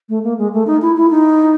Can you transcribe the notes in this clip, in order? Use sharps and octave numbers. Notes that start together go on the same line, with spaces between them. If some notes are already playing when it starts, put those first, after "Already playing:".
A3
A#3
G#3
A3
D#4
E4
E4
D#4